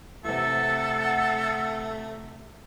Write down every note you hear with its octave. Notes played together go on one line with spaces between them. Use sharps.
C3 E3 A3 A4 F#5 E6